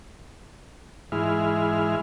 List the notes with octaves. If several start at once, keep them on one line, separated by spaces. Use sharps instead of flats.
G#2 E3 G#3 E4 F6